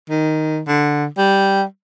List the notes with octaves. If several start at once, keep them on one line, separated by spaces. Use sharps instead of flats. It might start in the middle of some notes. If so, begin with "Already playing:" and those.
D#3
D3
G3